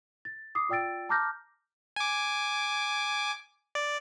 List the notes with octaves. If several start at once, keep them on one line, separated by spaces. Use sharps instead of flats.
A6
D6 D#6 C7
F4 D5 G5 E6 A6 D7
A5 A#5 D6 F6 G6 A#6
G#5 D6
D5